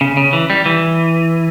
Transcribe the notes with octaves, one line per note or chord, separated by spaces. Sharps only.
C#3
C#3
E3
G3
E3